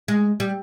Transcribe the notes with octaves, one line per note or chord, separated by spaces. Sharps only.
G#3
G3